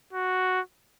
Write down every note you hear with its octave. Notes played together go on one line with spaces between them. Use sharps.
F#4